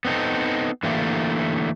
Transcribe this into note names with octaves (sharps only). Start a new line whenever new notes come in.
B3 C4 D#4 A4
D3 E3 A3 A#3 G4